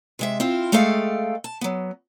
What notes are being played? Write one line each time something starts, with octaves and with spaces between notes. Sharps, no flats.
C3 G#3 E5
C4 E4 F4
G#3 A3 G#4 A4 F5 G5
A5
F#3 B3